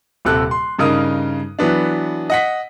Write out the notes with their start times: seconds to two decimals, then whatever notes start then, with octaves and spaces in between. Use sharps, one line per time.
0.25 D#1 C3 A4 F#6
0.51 C6
0.79 G2 C#3 D#4 A#4 D#6
1.59 E3 F#3 B3 D4
2.30 D#5 F#5 B6